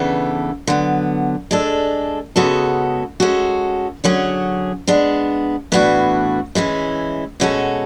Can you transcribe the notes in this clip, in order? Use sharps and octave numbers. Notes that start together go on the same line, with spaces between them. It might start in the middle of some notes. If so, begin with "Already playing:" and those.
Already playing: C#3 E3 B3 D4 A4
D3 F#3 B3
G#3 D4 A4
C#3 G#3 B3 F#4 A4
G#3 C#4 F#4 A4
D3 F#3 C#4 G#4
G#3 B3 D4
A2 E3 B3 D4 F#4
E3 G#3 C#4 E4
B2 G#3 C#4 F#4 A4